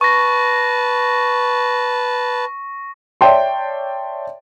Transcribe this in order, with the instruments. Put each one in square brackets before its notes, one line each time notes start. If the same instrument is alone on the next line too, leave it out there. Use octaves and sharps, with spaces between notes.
[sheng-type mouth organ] B4 A5 [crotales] C#6 A#6
[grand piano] C#5 D5 E5 G5 A5 C6